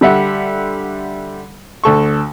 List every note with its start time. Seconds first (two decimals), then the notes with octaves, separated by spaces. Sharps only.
0.01 D3 G3 E5 F#5
1.84 D2 A4 C#6